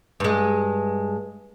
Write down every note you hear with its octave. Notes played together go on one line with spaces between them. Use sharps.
G2 G#3